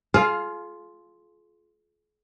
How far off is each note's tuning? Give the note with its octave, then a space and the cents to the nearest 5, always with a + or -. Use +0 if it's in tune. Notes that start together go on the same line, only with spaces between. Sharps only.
F4 +0 G#4 +40 F5 +10